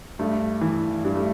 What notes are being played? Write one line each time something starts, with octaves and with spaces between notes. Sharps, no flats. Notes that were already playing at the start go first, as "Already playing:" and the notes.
G2 A3
E3
G2 G3
A3